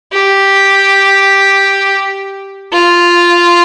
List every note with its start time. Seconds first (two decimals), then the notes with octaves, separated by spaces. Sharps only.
0.12 G4
2.72 F4